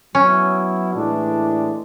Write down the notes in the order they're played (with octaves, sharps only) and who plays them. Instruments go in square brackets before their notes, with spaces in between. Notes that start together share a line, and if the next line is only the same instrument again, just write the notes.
[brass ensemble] F#3 B3 E4 [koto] C#4
[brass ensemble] A2 E3 G#3 D4